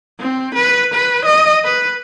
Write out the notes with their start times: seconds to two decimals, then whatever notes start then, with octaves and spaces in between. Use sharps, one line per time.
0.19 C4
0.55 B4
0.94 B4
1.25 D#5
1.64 B4